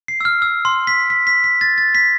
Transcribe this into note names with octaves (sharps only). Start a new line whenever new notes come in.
C7
E6
F6
E6
C6
B6
B6
B6
B6
A6
A6
B6